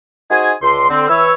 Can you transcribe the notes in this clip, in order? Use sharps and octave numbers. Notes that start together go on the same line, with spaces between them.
D#4 F#4 G#4 C5 G#5
C#2 D3 C6
D3 C4
E3 B4 C#5 E6